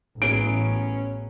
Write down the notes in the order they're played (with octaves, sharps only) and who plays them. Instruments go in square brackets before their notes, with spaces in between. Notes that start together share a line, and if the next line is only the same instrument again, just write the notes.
[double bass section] A1 [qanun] F#3 B3 G#4 [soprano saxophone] C#4 [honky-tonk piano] D7